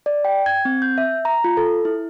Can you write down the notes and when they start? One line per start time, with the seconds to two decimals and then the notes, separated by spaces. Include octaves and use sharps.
0.06 D5
0.25 G5
0.46 G#6
0.65 C4
0.82 G6
0.98 E5
1.25 A#5
1.44 F4
1.57 A4
1.85 E4